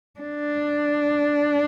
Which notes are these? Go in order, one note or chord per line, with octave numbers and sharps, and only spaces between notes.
D4